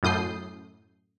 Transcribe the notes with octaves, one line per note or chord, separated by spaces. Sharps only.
F#2 A2 D#6 G6 C7